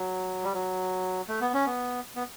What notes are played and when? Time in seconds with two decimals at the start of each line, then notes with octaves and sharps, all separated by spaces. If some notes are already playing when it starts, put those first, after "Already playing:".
Already playing: F#3
0.44 G3
0.53 F#3
1.28 A3
1.41 B3
1.54 C#4
1.66 B3
2.16 B3